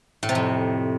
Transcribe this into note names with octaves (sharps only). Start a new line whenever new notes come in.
A2
C3
F2